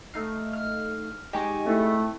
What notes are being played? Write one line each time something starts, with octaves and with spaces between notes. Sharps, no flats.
A3 D#4 F5
F6
G#3 D#4 G4 D#5 G#5 C#6
A3 C4 E4